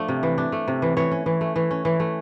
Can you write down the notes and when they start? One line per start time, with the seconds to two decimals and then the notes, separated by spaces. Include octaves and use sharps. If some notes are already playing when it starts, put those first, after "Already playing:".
Already playing: F3 A3 D4
0.08 C3
0.23 E3
0.38 D4
0.52 A3
0.68 C3
0.82 E3
0.97 E3 C#5
1.12 C#4
1.26 E3
1.41 A3
1.56 E3
1.71 C#4
1.85 E3
2.00 A3